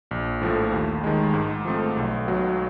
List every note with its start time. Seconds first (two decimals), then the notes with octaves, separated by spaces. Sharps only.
0.11 A#1
0.41 A2 F3 A3
0.72 D#2
1.04 D#3 G#3
1.34 G#2
1.65 F3 A3 C4
1.97 B1
2.27 B2 F#3